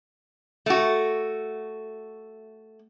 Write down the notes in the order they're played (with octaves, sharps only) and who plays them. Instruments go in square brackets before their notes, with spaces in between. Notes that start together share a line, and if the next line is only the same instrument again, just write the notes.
[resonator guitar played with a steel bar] A3 F#4